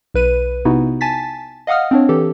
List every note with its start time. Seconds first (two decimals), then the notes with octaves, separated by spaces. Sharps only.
0.14 B1 B4 D#7
0.65 C3 B3 D#4 E4 F#4
1.01 G#5 A5 A6 B6
1.67 D#5 F5 F#5 D#6 F6
1.91 C4 D4 C#5
2.09 E3 G4 A4